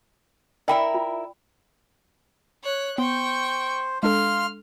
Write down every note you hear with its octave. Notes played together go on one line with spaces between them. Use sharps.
E4 A#4 D5 E5 G5 B5
F4
C#5 F#6
B3 C5 G5 C#6
G#3 D4 A4 F5 C6 F6